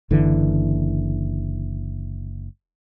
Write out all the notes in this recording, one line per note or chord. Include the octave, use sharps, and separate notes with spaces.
F#1 D3 E3